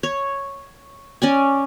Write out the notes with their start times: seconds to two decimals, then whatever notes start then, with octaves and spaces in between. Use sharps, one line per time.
0.03 C#5
1.22 C#4 D5 G#5